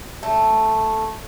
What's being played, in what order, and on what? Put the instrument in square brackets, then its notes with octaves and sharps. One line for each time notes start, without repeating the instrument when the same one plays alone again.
[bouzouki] A3